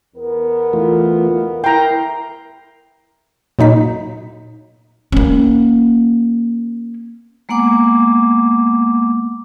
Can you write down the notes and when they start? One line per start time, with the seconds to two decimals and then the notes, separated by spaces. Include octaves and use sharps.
0.16 E2 B3 A#4
0.73 E3 A3 F4
1.64 E4 A#4 G5 A#5 C6
3.59 A#2 F#3 D#4 B6
5.12 A#3 C#4
7.49 G#3 A#3 B3 F#5 D6